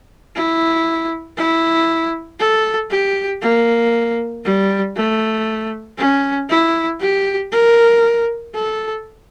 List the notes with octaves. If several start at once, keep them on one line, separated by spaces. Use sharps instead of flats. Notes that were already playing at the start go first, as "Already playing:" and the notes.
E4
E4
A4
G4
A#3
G3
A3
C#4
E4
G4
A#4
A4